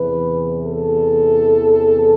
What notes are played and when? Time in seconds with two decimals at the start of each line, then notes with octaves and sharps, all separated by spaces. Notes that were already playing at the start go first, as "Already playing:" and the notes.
Already playing: E2 C3 E3 B4
0.67 A4